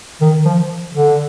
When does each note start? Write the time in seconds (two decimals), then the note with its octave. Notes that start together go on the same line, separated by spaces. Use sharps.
0.21 D#3
0.45 F3
0.94 D3